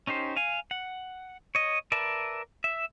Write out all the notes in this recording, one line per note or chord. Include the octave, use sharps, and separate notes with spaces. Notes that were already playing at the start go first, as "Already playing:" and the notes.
C#4 D#4 G4 C5
F5 G#5
F#5
C#5 D#5
A#4 B4 D5 E5 A5
E5